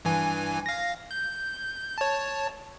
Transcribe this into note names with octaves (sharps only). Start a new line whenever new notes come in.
G2 E3 G#5
F5 A#6
G6
C#5 A5